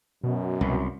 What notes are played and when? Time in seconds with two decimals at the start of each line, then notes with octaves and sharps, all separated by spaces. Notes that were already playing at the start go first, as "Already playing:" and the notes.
0.24 F#2 B2
0.61 C2